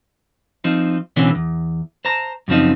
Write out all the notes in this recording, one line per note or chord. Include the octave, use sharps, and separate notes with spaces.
F3 C4 D#4
C#2 B2 D3 E3 C4 C#4
E2
C5 A5 A#5
F#2 C#3 F3 C4 D#4